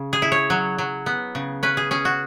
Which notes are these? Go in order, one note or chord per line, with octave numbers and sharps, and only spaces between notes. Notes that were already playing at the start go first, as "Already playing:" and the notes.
Already playing: C#3
G#4
E4
C#5
F#3
F#3
B3
C#3
C#4 B4
G#4
C#4 G#4
F#4